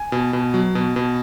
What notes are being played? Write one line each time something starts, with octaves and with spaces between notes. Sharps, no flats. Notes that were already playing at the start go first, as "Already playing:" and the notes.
Already playing: G#5
B2
B2
F#3
B2
B2